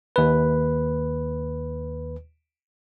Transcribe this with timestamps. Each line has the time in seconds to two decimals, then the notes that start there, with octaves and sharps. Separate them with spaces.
0.16 D#2 B4